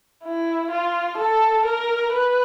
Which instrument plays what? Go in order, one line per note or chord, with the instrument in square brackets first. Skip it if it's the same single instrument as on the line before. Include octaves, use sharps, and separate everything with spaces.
[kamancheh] E4
F4
A4
A#4
B4